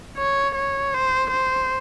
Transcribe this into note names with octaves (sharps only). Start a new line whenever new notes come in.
C#5
C#5
C5
C5